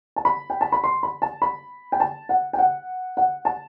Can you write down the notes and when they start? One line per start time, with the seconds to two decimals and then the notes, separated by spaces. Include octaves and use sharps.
0.16 A5
0.25 B5
0.50 G5
0.61 A5
0.72 B5
0.84 C6
1.03 B5
1.22 A5
1.42 B5
1.92 G5
2.00 A5
2.29 F#5
2.53 G5
2.58 F#5
3.17 F#5
3.45 A5